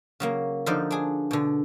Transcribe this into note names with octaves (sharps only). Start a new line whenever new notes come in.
C#3 F#3 A#3
D3 F3 D#4 C5 D5
D4 G#4
B2 D3